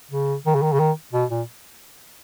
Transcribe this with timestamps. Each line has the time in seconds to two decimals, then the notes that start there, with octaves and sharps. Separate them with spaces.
0.11 C#3
0.46 D#3
0.55 C#3
0.62 D#3
0.73 C#3
0.79 D#3
1.13 B2
1.30 A#2